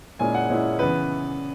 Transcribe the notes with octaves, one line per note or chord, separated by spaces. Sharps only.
A#2 G#3 C#4 E4 G#5
F#5
A#2 G#3 C#4 E4
C#3 E3 B3 B4